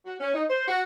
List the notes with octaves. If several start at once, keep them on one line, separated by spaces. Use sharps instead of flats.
F#4
C#4
D#4
C5
F#4